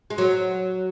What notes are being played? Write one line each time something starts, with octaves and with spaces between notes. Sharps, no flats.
G#3
F#3